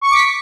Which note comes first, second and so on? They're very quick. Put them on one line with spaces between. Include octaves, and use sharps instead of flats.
C#6 C#7 D6 B6